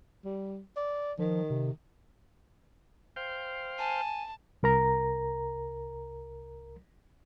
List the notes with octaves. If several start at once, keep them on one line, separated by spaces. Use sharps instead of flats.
G3
D5
D#3 F3
C3
C5 F5 G5
G#5 A5
C2 A#4 A#5